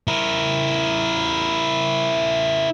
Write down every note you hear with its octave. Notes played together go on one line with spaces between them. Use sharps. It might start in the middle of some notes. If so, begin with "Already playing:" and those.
E4 A#4